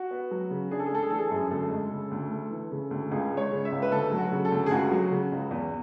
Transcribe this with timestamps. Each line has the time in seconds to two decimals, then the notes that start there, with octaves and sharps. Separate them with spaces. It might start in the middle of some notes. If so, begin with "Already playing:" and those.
Already playing: F#4
0.11 B3
0.31 F#3
0.51 C#3
0.71 D4 G#4
0.80 A4
0.86 G#4
0.92 A3 A4
1.03 G#4
1.10 E3 A4
1.18 G#4
1.27 A4
1.31 F#2 G#4
1.51 D2 A4
1.71 G#3
1.92 C#3
2.11 D2
2.31 A3
2.51 E3
2.71 C#3
2.91 D2
3.11 C#2 G#4
3.31 G#3
3.37 C#5
3.51 C#3
3.65 E5
3.72 C#2
3.82 B4
3.92 D2 A4
4.11 F#3
4.18 F#4
4.32 C#3
4.45 A4
4.52 D2
4.66 G#4
4.71 C#2 F#4
4.92 F#3
5.11 C#3
5.32 C#2
5.51 E2